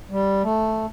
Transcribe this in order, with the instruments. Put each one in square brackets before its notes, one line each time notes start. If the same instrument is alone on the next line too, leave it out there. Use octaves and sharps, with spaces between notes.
[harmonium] G3
A3